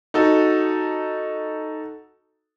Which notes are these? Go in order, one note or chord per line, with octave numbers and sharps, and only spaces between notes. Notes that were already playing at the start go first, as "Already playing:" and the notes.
D#4 F#4 A4